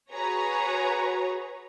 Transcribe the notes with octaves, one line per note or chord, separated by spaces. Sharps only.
F#4 G#4 B4 C#5 A#5